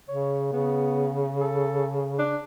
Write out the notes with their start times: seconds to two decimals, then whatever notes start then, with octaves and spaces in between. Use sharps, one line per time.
0.08 C#3 C#5
0.53 C#3 B3
1.41 A4
2.19 D4